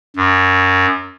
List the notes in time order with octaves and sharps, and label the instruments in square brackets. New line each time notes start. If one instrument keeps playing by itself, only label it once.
[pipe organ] F#2